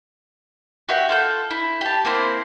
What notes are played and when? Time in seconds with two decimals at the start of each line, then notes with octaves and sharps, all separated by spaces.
0.89 F#4 G4 E5 F#5
1.09 F4 A4 G6
1.51 E4
1.81 G4 A5
2.05 A#3 C4 E4 C5